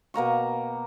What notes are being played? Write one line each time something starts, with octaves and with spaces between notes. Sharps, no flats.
B2 A#3 A#5 C#6